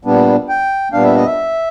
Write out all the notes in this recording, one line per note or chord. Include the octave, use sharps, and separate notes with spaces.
A#2 G3 B3 D4
G5
A#2 G3 B3 D4 F5
E5
D#5
E5